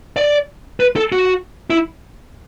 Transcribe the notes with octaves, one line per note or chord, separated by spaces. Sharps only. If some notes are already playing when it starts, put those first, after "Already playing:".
D5
B4
A4
F#4
E4